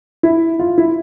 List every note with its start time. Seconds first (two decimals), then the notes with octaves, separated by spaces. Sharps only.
0.23 E4
0.59 F4
0.78 E4